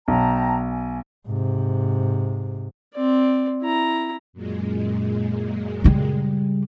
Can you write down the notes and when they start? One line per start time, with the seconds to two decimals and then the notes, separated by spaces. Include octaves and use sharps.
0.08 B1 G5 A5 A#5
0.71 G#5
1.27 G#2 C3
2.94 C4 D5
3.62 E4 A#5
4.33 F#2 A#2 G#3
5.84 C#3 G3